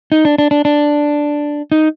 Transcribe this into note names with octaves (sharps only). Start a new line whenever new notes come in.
D#4
D4
D4
D4
D4
D#4